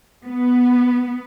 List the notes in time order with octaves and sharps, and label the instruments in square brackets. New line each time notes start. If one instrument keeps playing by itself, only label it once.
[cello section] B3